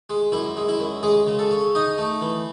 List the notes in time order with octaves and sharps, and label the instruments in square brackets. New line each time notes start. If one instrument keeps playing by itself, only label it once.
[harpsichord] G#3
F#2 E4
G#3
E4
F#2
G#3 G#4
C#3
A4
C#4
D#4 D#5
A3
E3